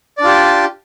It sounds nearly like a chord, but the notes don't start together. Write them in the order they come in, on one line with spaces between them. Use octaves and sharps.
D5 D4 F4 G4